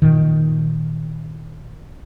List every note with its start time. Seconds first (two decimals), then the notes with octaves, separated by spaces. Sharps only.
0.02 A#2 D#3